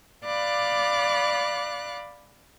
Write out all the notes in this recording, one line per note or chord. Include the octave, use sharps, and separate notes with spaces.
D5 F5 B5 D6 F#6